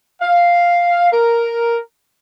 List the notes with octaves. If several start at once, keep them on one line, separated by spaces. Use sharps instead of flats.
F5
A#4